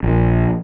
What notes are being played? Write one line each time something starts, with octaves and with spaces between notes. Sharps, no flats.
A#1